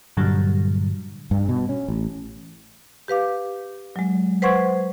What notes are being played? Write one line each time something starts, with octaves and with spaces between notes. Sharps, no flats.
G2 A#2 D3 F#3 G3
G2
B2
C#4
A1
G4 B4 F5 D6
F#3 G#3
B4 C5 F#5 C6 C#6 G#6